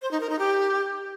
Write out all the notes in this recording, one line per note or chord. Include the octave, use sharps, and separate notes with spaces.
C5
D#4
A#4
D#4
G4